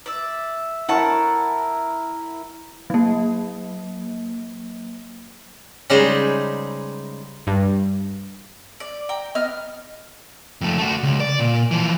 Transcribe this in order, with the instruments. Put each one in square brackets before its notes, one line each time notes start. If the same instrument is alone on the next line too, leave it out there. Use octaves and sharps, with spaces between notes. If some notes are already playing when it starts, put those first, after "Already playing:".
[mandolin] D5 E5
[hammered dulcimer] E4 A#4 [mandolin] F#5 A5 C#6
[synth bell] F#3 A#3
[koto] C#3 G3 G#3 D#4 G#4 C5
[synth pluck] G2
[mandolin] D5
G5 A#5
B3 D#5 F6
[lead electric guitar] F2 A3
A3 F#4
C#2
D5
A#2
E3 F3